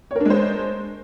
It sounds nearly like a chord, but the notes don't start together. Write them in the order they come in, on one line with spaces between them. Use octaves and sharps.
C#5 A#4 D4 G#3 C5